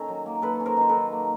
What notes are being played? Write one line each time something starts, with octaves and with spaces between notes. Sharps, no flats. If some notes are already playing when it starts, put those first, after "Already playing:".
Already playing: D#3 C#4 A4
F#3
A#3
F#3 A4 B4
C#4
A#4 C5
D#3 C5
A4 B4
F#3
A#3